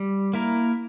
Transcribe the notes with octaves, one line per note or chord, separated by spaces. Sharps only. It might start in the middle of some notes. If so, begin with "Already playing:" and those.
Already playing: G3
A#3 E4 A#4